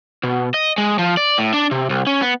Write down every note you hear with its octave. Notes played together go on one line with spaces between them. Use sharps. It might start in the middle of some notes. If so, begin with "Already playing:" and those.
B2
D#5
G#3
F3
D5
A2
D4
C3
C2
C#4
B3